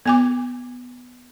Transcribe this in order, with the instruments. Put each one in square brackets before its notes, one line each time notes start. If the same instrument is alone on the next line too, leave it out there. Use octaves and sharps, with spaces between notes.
[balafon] B3 G#5 D6